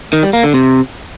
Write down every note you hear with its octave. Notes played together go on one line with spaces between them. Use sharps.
D#3
G3
A#3
D3
C3